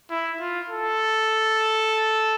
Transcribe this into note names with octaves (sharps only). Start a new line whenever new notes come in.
E4
F4
A4